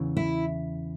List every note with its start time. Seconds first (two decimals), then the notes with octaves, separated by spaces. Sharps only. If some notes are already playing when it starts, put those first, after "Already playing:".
Already playing: E2 C#3 E3
0.17 E4